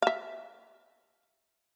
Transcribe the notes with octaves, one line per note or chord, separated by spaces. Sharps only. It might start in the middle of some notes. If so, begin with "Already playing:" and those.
E5 F5